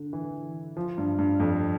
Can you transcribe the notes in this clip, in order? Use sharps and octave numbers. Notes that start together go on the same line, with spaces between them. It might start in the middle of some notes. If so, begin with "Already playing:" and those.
Already playing: D3
E3
F3
G2
G2
F2